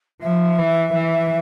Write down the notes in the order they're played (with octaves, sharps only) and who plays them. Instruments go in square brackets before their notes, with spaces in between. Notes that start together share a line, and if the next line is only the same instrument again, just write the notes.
[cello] F3 [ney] E5
[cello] E3
E3